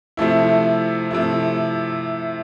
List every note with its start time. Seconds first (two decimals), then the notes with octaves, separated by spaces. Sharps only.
0.17 C3 F3 A3 E4
1.11 C3 F3 A3 E4